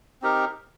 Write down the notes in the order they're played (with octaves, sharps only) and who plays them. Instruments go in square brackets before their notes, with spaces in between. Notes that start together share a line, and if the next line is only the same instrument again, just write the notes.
[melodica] C4 D#4 G4 A#4